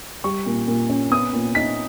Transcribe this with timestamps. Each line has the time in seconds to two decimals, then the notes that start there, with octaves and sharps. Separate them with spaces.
0.24 G3 C#6
0.46 A#2
0.68 A#2
0.89 C#4
1.11 B3 D#6
1.33 A#2
1.55 D#4 B6